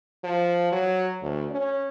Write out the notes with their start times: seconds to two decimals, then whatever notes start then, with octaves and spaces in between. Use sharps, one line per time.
0.24 F3
0.72 F#3
1.22 D2
1.51 C#4